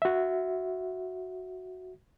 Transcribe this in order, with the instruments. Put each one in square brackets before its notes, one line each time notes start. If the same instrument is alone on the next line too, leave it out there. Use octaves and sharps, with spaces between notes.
[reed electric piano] F#4 E5